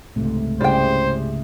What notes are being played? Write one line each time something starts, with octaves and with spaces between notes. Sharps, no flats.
C#2 G#2 C3 A3
C#3 G3 E4 G#4 C5 G5